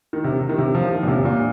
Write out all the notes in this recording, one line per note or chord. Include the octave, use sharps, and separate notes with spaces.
D#3
C3
D#3
C3
F3
D#3
A#2
C3
A#2